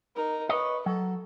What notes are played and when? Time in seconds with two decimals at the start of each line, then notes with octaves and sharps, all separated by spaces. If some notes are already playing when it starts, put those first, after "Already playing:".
0.16 D#4 A#4
0.49 B4 C#5 D#5
0.86 F#3 A4